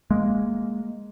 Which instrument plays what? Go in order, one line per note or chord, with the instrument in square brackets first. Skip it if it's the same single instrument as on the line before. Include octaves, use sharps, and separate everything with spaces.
[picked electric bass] G#3 A#3